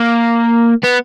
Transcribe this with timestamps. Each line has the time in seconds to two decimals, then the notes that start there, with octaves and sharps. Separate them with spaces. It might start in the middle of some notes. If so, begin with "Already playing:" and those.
Already playing: A#3
0.84 B3